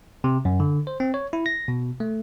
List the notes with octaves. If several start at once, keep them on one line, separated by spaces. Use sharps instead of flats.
C3
F#2
D3
C5
C4
C#5
E4
A#6
B2
A3